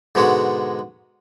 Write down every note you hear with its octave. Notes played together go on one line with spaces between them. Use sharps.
G#2 B2 D3 G#3 F#4